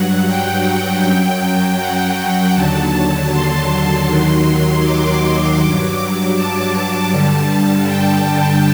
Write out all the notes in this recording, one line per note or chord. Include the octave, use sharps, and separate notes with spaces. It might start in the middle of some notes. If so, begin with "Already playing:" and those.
Already playing: G2 F#3 F#5
G5
F#2 F#3
F#5
D#2 D3 F#3 A5
C6
D#2 D#3 F#3
D6
G2 F#3
A5
G2 D3 G3
G5
G5